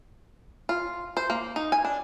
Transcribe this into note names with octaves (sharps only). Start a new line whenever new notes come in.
F4
C5
A#3
D#4
G#5
D4